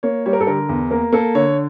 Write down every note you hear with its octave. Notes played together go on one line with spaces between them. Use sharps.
A#3 C#5
G3 C#5
A#4
A4
D3 A#4
E2
A#3 A#4
A#3 A4
D3 C#5